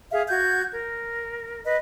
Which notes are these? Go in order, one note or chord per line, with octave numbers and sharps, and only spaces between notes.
G#4 E5 F5
F#4 G6 G#6
A#4
B4 D#5